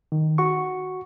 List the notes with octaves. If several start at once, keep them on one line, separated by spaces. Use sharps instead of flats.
D#3
F#4 C#6